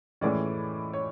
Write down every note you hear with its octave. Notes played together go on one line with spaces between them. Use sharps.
A2 E3 G#3 C#4 D5
C#5